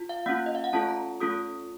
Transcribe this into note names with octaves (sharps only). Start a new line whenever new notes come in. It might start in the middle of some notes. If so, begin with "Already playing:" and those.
Already playing: F4
F5
A#3 C#4 F4 F#5
D#5
F5
F#5
A3 C#4 F4 A4 A5
A#5
A3 C#4 F4 A4 D#6